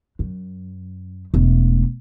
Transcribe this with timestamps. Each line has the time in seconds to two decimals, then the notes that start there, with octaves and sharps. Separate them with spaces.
0.19 F#2
1.34 E1 A3